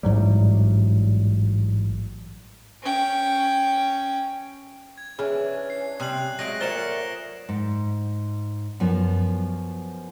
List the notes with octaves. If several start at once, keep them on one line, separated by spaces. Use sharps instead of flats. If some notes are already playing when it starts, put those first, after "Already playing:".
A1 G#2 F#3 G3
C#4 G5
G#6
E3 C#4 D4 G#4
C7
C3 G3 D#6 F#6 F#7
F#3 G#3 A3 A#6 D7
A#2 F#3 A3 A#4 C5 C#7 E7 G7
G#2
F#2 F3 B3